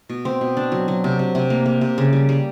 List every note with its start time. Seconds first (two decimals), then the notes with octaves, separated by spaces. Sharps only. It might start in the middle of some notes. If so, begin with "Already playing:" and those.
0.09 B2
0.25 C4
0.41 B2
0.57 D4
0.72 F#3
0.88 F#3
1.04 C3
1.19 C3
1.35 C3
1.50 A#3
1.66 A#3
1.81 C3
1.98 C#3
2.13 G3
2.29 G3